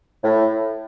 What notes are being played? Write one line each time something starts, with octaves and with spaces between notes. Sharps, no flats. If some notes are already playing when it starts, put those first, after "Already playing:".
A2